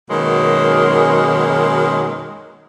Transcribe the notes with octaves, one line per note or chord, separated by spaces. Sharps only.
F#2 B2 D#3 F#3 G#3 A#3